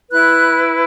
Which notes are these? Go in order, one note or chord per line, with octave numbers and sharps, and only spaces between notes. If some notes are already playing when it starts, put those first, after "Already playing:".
E4 B4 F#6